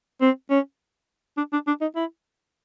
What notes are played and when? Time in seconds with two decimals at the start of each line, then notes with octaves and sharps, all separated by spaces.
0.21 C4
0.50 C#4
1.37 D4
1.53 D4
1.67 D4
1.81 D#4
1.96 E4